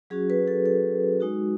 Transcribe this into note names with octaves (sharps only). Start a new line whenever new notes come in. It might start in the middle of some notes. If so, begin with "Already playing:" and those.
F#3 C#4 F#4 G#4
B4
A4
A4
G#3 D#4 F#4